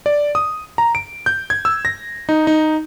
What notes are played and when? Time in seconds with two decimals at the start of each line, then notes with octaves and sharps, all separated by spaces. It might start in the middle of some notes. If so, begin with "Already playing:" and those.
0.06 D5
0.35 D#6
0.78 A#5
0.95 D7
1.26 G6
1.50 G#6
1.65 E6
1.85 A#6
2.29 D#4
2.47 D#4